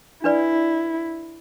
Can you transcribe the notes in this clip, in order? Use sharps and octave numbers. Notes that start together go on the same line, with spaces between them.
D4 E4 B4 D5